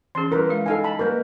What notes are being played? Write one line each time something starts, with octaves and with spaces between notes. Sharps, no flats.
E3 C#4 G#4 C6
G3 E4 A#4 B4
G#3 F5
D#4 A4 D#5 F5 G#5
A5 B5
G3 A#3 A#4 B4 D#5